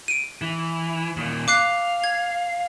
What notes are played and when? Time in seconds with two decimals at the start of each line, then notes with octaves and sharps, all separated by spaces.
0.08 D7 D#7
0.42 E3
1.17 D#2 A#2
1.48 F5 D6 F#6 C7
2.04 G#6